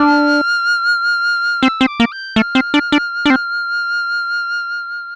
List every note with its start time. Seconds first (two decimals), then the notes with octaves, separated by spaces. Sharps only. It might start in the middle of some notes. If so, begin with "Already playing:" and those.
Already playing: D4 F6
1.62 C4 E6
1.81 C4
1.88 D6
2.00 A#3
2.12 G6
2.36 A3 F6
2.55 C4
2.74 D4
2.92 D4
3.26 D4
3.30 C4